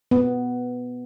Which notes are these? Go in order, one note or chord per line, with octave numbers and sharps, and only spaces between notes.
B3